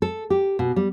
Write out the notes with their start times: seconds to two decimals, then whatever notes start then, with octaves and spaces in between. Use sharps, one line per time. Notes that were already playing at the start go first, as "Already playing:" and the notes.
0.02 A4
0.30 G4
0.59 B2
0.76 G3